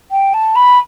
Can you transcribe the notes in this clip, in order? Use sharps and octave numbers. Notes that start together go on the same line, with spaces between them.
G5
A5
B5